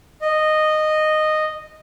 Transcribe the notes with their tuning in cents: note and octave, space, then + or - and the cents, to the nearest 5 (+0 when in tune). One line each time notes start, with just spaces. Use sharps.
D#5 -10